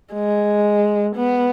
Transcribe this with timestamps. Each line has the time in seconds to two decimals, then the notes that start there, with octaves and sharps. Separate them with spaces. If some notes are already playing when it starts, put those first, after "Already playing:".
0.13 G#3
1.17 B3